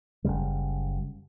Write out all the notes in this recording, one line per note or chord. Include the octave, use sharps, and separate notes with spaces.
F#1 D#2 C#3 G3